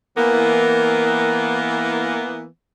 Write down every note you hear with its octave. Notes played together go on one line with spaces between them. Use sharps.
E3 A#3 B3